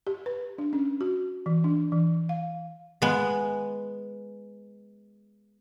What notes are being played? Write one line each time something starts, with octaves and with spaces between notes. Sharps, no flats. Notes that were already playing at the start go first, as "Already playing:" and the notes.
G4
B4
D4
C#4
F#4
E3
D4
E3
F5
G#3 B3